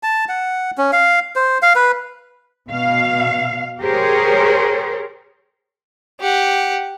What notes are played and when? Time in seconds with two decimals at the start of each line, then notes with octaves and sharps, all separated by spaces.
0.03 A5
0.29 F#5
0.78 C#4
0.92 F5
1.36 C5
1.62 F5
1.76 B4
2.70 B2 F5
3.81 G4 G#4 A#4 C5 C#5
6.21 G4 F#5